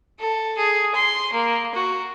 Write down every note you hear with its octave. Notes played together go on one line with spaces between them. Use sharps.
A4
G#4
C6
A#3
F#4